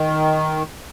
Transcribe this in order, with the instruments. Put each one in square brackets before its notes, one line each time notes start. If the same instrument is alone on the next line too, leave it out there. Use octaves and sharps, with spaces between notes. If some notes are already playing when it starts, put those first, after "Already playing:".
Already playing: [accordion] D#3